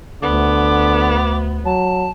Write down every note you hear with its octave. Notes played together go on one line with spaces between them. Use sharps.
D2 D3 B3 D6
F#3 A5